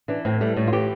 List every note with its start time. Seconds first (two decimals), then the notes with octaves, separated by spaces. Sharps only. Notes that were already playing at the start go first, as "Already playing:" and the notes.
0.08 E3 D4
0.25 A2 C4
0.41 G3 A3
0.56 A2 A3
0.67 F4
0.72 E3 G4